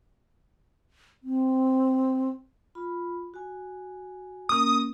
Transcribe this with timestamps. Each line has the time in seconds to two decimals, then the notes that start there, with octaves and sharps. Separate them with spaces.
1.23 C4
2.75 F4 B5
3.34 F#4 G#5
4.49 A#3 C#4 A#4 D#6